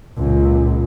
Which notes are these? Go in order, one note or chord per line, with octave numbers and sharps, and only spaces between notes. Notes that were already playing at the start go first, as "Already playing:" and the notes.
C#2 A#2